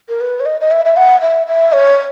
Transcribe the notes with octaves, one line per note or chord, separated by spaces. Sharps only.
A#4
B4
C#5
D#5
D#5
E5
E5
F#5
E5
E5
C#5